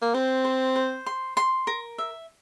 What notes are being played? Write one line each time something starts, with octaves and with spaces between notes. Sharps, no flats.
A#3
C4 C5
C5
C5
C6
C6
A#4
E5